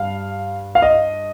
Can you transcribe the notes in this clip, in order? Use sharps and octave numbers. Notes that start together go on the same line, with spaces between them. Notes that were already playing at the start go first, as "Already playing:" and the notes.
Already playing: G2 F5
F5
D#5